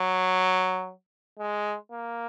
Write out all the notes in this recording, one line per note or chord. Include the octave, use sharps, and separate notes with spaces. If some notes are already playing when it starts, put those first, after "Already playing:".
Already playing: F#3
G#3
A#3